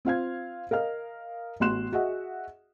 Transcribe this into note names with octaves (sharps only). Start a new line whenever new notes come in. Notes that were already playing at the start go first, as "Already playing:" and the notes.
C4 F4 F5 G#6
A#4 D#5 F5 F6
A1 B3 F#4 C6 F#6 E7
F#4 G#4 D#5 E5 F#5